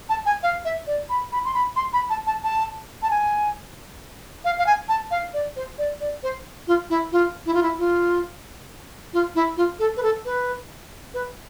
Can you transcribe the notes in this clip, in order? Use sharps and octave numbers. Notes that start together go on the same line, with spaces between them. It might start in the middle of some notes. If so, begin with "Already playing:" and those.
A5
G#5
F5
E5
D5
B5
B5
C6
B5
C6
B5
A5
A5
A5
A5
G#5
F5
F5
G#5
A5
F5
D5
C5
D5
D5
C5
F4
E4
F4
E4
F4
E4
F4
F4
E4
F4
A4
B4
A4
B4
B4